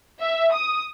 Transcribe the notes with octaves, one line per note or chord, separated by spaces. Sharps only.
E5
D#6